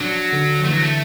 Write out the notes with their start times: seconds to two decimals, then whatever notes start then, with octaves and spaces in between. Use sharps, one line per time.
0.01 F#3 D4
0.33 D3
0.65 E3 A3
0.73 F#3
0.82 A3